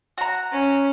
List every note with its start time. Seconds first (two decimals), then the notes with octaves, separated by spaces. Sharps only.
0.18 F#4 A#5
0.52 C#4